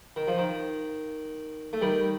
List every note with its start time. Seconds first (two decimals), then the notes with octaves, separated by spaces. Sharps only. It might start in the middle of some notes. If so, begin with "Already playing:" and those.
0.16 D#3
0.27 F3
0.38 D#3
1.73 A3
1.81 D#3 G3